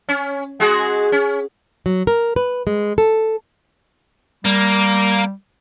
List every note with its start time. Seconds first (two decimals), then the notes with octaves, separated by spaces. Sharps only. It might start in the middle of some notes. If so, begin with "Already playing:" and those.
0.09 C#4
0.60 G#3 F#4 G#4
1.12 C#4
1.86 F#3
2.07 A#4
2.36 B4
2.67 G#3
2.98 A4
4.45 G3 A#3